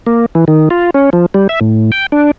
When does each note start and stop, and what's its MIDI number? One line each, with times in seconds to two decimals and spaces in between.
0.07 0.26 58
0.35 0.45 52
0.48 0.69 51
0.70 0.90 65
0.94 1.10 61
1.13 1.26 53
1.34 1.47 55
1.49 1.60 76
1.61 1.91 45
1.92 2.06 79
2.12 2.31 62